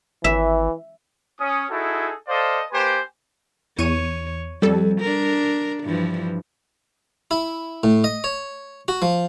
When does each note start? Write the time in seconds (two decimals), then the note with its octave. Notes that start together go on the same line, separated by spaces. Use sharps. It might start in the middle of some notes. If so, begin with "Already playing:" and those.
0.24 G#1 E3 E5
1.40 C#4 D#6
1.70 D#4 E4 F#4 G#4 A4
2.28 A4 C5 D5 D#5 F5
2.72 A#3 G4 B4 C5 G#5 C6
3.79 E2 C#5 C#6 D#7
4.62 F2 G3 A4
5.01 D4 A#4
5.84 G2 E3 F3
7.31 E4
7.83 A2
8.04 D#5
8.24 C#5
8.88 F#4
9.02 F3